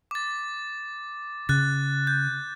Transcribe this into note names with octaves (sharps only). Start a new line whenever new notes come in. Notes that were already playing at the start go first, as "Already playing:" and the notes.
D6 A6
C#3 F#6 A6
G6